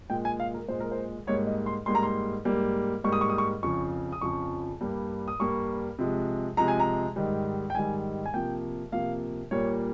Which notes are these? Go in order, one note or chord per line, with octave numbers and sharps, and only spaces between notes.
A#2 G#3 G5
G#5
F5
A#4
A#2 G#3 C5
A#4
C5
G#2 G3 A#3 C#5
D#5
C6
G#2 G3 A#3 C6
A#5
C6
G#2 G3 A#3
G#2 G3 A#3 C#6
D#6
C#6
D#6
C#6
F2 C#3 F3 C#6
D#6
F2 C#3 F3 C#6
G2 G3 A#3
D#6
G2 G3 A#3 C#6
C3 F3 G#3
C3 F3 G#3 A#5
G#5
A#5
G#2 D#3 G3
G5
G#2 D#3 G3 G#5
G#5
C3 F3 A#3 G5
C3 F3 A#3 F5
A#2 G3 A#3 C#5